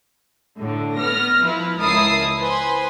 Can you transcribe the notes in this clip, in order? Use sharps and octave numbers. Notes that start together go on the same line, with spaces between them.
A2 D3
B3 F6 A#6
F3 E4 B4
C#2 E4 A#4 A5 D#6 C7
B4 C5 G#5 C6